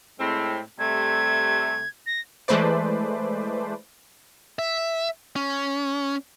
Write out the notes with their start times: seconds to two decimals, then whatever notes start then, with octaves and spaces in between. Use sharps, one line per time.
0.20 A2 G#3 C4
0.79 C3 G3 A3 G#6
2.06 A#6
2.48 E3 G#3 A3 B4 C5 D5
4.59 E5
5.36 C#4